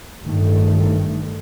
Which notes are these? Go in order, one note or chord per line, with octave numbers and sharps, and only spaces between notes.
A1 G2 D#3 A3